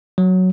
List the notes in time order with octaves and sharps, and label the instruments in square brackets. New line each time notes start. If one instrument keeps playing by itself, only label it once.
[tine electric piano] F#3